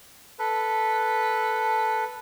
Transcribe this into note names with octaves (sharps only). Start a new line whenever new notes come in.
A4 B4